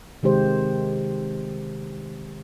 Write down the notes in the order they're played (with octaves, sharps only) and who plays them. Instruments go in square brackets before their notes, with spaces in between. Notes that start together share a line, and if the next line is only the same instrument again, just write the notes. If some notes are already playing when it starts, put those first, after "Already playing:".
[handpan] C3 D#3 G#3 G4 C5